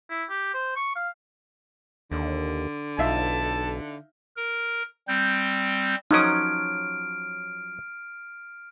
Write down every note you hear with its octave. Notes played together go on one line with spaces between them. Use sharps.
E4
G4
C5
C#6
F5
D#2 D3
B1 D#4 F4 E5 A5
A#4
G3 C4 G6
F3 F#3 C#4 D#4 D#6 F6 D7